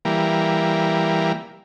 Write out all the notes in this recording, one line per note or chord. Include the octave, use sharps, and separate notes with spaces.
E3 G3 A#3